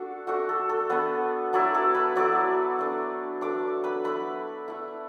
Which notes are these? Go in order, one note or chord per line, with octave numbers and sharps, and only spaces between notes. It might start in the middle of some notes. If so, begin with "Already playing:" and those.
Already playing: A3 D4 F#4 A4
A3 D4 F#4
A4
A4
A3 B3 D4 B4
F#3 A3 D4 E4 D5
A4 A5
B4 B5
F#3 A3 E4 D5 D6
A3 D4
A3 D4 D5 D6
B4 B5
A3 E4 B4 B5
A3 E4